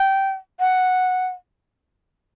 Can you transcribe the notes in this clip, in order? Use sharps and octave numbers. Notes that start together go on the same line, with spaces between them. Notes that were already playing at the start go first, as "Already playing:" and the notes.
Already playing: G5
F#5